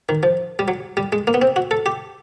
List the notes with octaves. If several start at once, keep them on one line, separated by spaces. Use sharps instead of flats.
D#3
F3
G3
F#3
G3
G#3
A#3
B3
C4
F#4
A4
G4